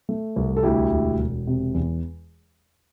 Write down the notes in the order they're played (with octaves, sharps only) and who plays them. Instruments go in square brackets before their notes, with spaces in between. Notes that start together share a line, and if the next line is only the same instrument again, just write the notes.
[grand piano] A3
C2
A4
D2 E4 G4
E1
E1
C3
E2